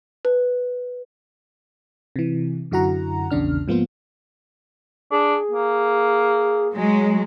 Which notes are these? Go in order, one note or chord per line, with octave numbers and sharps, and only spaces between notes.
B4
C3 E3
F#2 D3 E4 F#4 F#5 A#5
A#1 E2 C#3 D4 F6
G#2 F3 A#3 B3 F4
D4 G#4
A#3
F#3 G#3